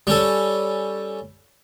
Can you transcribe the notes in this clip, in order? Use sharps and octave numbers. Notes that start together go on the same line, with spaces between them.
G3 C#4 A4